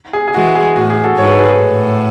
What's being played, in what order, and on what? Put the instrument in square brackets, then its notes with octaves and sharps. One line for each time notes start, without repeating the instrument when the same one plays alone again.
[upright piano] G#4
G#4
[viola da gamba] E3 G#3 [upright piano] F#4
[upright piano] G#4
[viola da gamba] A2 [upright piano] F#4
[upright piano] G#4
F#4 A4
[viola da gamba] G#2 [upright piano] C#5
[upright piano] B4
A4
G#4 B4
[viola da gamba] A2